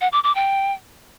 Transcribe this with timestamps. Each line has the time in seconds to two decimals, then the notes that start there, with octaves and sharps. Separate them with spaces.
0.01 F#5
0.12 D6
0.24 D6
0.35 G5